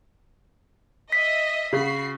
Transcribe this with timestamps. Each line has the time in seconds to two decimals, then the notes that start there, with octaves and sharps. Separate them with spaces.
1.12 D#5 E5 B6
1.73 C#3 F#4 B5 C7